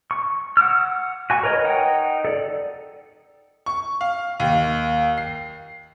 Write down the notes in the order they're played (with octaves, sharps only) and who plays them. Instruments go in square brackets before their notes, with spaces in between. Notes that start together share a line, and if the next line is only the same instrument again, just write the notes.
[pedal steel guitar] C#6
F#5 D6 E6 F6
F#4 G#5 C#6
A#4 B4 C#5 D#5
D#4 F#5 G5
A4 D5
[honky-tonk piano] C#6
F5
D#2
C7